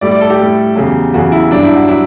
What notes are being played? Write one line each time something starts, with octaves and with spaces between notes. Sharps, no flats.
A2 G3 D5
D5
A4
G4
A2 G3
E2 C#3 F#3
E2 C#3 F#3 F#4
E4
G2 F#3 D4
E4
F#4
F#3 E4